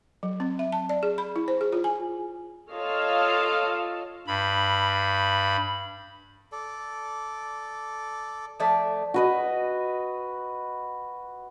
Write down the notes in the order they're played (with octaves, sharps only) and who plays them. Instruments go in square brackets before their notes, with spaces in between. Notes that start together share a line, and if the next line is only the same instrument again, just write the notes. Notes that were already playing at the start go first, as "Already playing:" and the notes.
[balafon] F#3
C4
E5
A5
D5
G#4
B5
E4
C5
G#4
F4
G#5
[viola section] F4 A4 C#5 D#5 F5 A5
[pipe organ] G2 B5
[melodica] A4 D5
[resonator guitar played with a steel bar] F3 A3 D5
[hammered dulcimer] F#4 B4 D#5